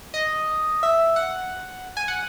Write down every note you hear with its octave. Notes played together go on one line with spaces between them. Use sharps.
D#5
E5
F#5
G#5
F#5